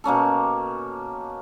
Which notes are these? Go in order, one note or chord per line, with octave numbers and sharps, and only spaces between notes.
B2 A#3 C#4 A4